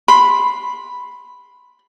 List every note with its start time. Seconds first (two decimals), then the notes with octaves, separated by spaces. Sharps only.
0.08 B5 C6